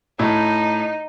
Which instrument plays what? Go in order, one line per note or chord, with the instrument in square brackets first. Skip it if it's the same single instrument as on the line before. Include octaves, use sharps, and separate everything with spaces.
[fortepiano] A2 [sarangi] D#4